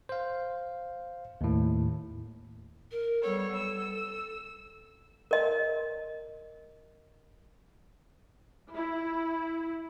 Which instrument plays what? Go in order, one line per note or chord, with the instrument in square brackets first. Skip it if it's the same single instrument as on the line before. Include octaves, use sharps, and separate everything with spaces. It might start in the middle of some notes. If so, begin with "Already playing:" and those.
[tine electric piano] C5 F5
D#2 A2
[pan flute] A#4
[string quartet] G3 B3 C#5 [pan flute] A4
[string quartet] E6
[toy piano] A#4 D#5
[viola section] E4